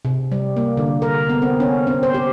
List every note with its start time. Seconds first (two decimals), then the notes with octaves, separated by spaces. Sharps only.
0.05 C3
0.32 G3
0.56 A#3
0.77 D3
1.02 A#4
1.30 B3
1.42 C4
1.60 C#4
1.87 C4
2.03 C5
2.14 G4